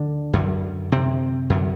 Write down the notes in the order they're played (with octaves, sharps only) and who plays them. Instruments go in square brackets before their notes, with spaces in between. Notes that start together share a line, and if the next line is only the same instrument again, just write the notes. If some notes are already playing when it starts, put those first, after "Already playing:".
Already playing: [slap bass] D2 D3 D4
F#2 D3
C3 C4
F#2 D3